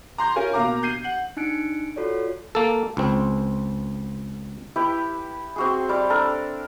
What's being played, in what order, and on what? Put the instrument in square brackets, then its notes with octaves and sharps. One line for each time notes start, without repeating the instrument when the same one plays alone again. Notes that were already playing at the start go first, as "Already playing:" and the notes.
[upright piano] A#5 C6 G6
C#4 F4 A#4 G#5
B2 A#3 F5 A#5 D6
G6 C7 D#7
F#5
[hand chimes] D4 D#4 F#6 C#7 D7
F4 F#4 A4 C#5 D5
[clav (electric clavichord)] A#3 A4
C#2 C4
[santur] E4 G4 B4
C4 F#4 G#4
G3 D5
D4 A4 A#4